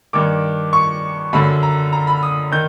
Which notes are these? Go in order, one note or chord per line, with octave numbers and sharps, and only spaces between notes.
G2 D#3 D6
C#6
F#2 D3 B5
A#5
A#5
B5
D#6
D#3 G6